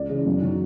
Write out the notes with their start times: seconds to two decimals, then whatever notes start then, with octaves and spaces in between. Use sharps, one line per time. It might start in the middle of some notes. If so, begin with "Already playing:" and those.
Already playing: C#2 D5
0.10 C#3 E3
0.26 F#2
0.42 D#3 F#3